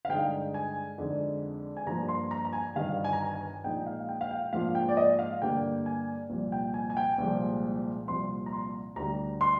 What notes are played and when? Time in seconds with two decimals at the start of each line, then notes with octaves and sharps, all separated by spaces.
0.05 F5
0.09 G2 D3 G#3 D#4 G5
0.54 G#5
0.98 F2 D3 G#3 D#4
1.77 G#5
1.87 G2 F3 A#3 F4 A#5
2.09 C6
2.31 A#5
2.45 A#5
2.53 G#5
2.75 G1 G2 D#3 F5
3.04 G#5
3.13 A#5
3.22 G#5
3.34 G#5
3.64 A#1 A#2 G#3 D#4 G5
3.86 F5
4.09 G5
4.21 F5
4.31 G5
4.53 G#2 F3 A#3 D4 F4 F5
4.75 G5
4.89 D5
4.97 D#5
5.19 F5
5.42 G2 D3 G3 A#3 G5
5.86 G#5
6.30 C2 A#2 F3
6.52 G5
6.74 G#5
6.90 G#5
6.97 G5
7.18 C2 A#2 F3 G#3 C4
8.07 C2 A#2 F3 C6
8.46 A#5
8.52 C6
8.96 D2 D3 G3 A#5
9.41 C6